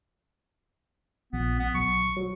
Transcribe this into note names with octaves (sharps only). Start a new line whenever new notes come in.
A#1 B3
B3
B1 C#6
F#3